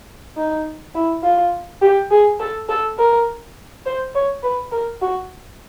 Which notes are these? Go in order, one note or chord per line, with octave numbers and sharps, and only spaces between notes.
D#4
E4
F4
G4
G#4
A4
A4
A#4
C5
C#5
B4
A#4
F#4